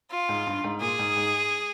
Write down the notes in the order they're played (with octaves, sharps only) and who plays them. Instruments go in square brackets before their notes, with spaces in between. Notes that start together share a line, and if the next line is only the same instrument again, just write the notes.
[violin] F4
[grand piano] G#2
G2
G#2
[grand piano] A#2 [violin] G#4
[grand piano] G#2
G#2